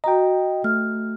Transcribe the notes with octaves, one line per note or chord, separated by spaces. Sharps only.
F#4 D#5 G5 A#5
A3 F6